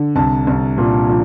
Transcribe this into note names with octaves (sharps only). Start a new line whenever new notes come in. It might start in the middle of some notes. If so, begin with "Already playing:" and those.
Already playing: D3
C2 A5
C2
A#2
F3